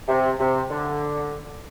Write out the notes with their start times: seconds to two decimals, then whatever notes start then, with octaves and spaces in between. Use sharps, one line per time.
0.08 C3
0.40 C3
0.70 D3